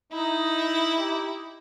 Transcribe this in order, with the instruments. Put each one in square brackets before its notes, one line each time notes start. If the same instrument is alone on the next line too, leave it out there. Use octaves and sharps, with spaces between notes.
[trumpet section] D#4 [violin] E4
[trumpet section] D#4 G4